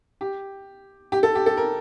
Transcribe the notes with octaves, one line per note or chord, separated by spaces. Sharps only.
G4
G4
A4
G4
A4
A#4